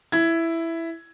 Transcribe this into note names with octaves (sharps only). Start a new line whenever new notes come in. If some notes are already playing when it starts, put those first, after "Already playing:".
E4 G#6